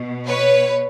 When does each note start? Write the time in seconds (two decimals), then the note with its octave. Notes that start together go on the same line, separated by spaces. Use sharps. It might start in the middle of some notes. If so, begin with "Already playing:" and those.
Already playing: B2
0.27 B4 C#5